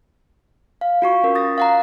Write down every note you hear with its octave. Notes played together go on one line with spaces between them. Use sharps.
F5
F4 F#4 C#6
C#4 A#4
D#6 A6 A#6
F5 F#5 A#5